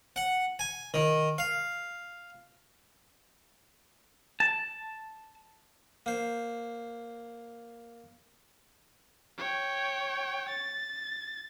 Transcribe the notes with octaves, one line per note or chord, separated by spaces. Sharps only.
F#5
G#5
D#3
F5
A5
A#3 C5
C#5 G5
A6